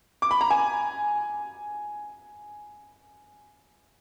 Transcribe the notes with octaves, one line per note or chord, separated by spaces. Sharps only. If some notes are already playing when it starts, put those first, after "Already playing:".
D6
B5
A#5
G#5